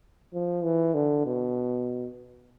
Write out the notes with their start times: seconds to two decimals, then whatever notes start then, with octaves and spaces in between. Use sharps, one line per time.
0.34 F3
0.64 E3
0.94 D3
1.26 B2